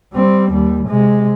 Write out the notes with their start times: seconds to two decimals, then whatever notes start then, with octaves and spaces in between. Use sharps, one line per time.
0.14 G3 C4
0.52 D#2 G3
0.89 C3 G#3